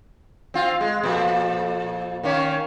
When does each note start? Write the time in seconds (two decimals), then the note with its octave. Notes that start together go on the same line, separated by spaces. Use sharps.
0.54 C4 F4
0.80 G#3
1.03 F2 A#2
2.23 D#3 A#3 C#4